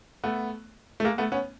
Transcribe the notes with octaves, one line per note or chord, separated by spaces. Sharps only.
A3 B3
A3
G#3 A#3
A3 B3
B3 C#4